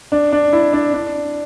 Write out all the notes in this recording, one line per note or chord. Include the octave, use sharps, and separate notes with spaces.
D4
D4
E4
D4
D4